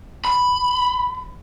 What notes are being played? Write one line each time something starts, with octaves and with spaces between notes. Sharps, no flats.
B5